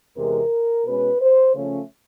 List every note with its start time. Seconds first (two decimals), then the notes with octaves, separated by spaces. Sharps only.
0.16 E2 C3 E3 G#3 A#4
0.86 B2 G#3 C#4 B4
1.21 C5
1.55 C#3 F3 A3 C#4